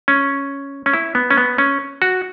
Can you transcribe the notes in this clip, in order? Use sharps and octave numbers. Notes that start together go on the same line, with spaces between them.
C#4
C#4
E4
B3
C#4
B3
C#4
F#4